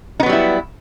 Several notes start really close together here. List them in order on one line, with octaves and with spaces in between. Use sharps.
D#4 B3 F#3 G3 E4